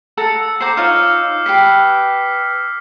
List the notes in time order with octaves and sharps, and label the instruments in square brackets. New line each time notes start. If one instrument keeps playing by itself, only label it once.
[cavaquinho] A4 F#5 A#5 [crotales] E6 C#7
[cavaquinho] C5 F#5 A#5 [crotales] D6 G6 C7
[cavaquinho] D#4 F4 C#5 [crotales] F6
[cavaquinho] G4 B4 [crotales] B6 C7